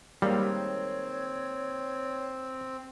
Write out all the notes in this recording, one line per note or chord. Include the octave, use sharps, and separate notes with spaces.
D#3 G3 G#3 A#3 C4 C#5